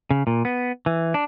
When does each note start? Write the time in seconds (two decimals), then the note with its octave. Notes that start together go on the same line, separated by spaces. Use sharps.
0.11 C#3
0.27 A#2
0.45 B3
0.86 E3
1.14 D4